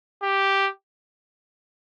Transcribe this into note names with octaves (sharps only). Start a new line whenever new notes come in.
G4